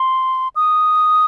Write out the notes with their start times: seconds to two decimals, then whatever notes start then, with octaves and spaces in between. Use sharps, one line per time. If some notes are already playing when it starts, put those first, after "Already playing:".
Already playing: C6
0.56 D#6